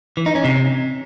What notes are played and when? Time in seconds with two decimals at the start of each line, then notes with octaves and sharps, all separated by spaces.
0.17 E3
0.26 D#4
0.35 C#4
0.44 C3